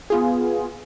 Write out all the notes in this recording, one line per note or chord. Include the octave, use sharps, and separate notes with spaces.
B3 F4 G#4